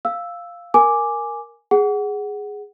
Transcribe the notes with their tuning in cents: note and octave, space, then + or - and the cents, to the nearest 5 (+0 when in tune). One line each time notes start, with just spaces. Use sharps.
F5 +0 E6 +0
A#4 +0 G#5 +0 D6 +0
G#4 +0 F#5 +10